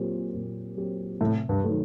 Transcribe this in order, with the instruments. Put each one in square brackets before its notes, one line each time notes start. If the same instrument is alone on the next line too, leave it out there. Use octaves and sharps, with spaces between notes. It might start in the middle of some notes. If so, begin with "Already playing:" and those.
Already playing: [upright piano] A#2 F#3 C4 G4
A#2
F#3 C4 G4
[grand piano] A2 [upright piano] C3
[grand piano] G2
[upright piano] D#3 F#3 A3